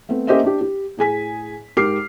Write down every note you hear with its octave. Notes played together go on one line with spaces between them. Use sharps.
A3 B3 C4
A#3 C#4 G4 C5 D#5 E5
D4 G4
G4
A2 G#4 G#5 B6
G#2 G4 A#4 D6 F6 C7